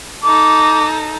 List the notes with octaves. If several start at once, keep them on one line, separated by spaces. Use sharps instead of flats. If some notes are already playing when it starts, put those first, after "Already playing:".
D#4 A4 D6